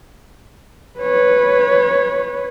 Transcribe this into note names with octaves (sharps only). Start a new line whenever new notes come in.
B4 C#5